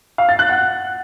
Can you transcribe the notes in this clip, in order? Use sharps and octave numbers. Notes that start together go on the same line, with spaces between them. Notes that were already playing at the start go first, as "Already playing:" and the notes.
F5
A6
F#6
F#5